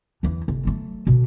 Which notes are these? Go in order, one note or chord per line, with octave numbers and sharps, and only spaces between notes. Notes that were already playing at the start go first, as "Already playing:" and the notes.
E2 E3
F1
F#3 A3
B2 D3